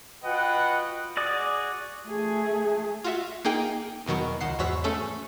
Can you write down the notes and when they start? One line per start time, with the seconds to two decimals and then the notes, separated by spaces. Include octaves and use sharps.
0.24 F4 F#4 B4 D#5 F#5 G5
1.17 F#4 G#4 D5 D6 D#6
2.08 A3 G#4
3.04 F4 F#4 E5
3.45 A#3 D#4 G#4 G5
4.06 E2 B2 D#3 F#3
4.41 C#2 D#3 F#5 C7
4.59 E2 G#2 F#4 C#5 E6 B6
4.84 A3 C#4 G#4 A4